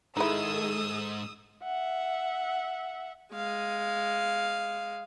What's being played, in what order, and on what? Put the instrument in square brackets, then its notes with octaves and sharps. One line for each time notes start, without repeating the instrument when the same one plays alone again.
[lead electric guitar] G#2 [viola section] D#3 G#4 A4 [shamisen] D#4 E4 [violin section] D#6 E6
[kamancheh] E5 F#5
[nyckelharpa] G#3 F5